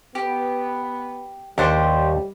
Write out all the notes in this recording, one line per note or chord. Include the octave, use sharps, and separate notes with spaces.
B3 G4
D#2 G3 D4 G4 C5 C#6